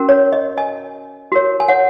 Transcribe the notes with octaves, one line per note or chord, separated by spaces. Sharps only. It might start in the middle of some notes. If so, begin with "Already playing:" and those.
Already playing: C#4 F#4 A#4
C#5
D#5
D#5 G#5
F#4 A#4 C#5
G#5
C#5 F#5